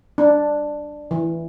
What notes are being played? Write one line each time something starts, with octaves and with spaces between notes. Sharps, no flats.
D4
E3